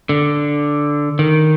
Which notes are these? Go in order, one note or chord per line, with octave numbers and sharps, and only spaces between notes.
D3
D#3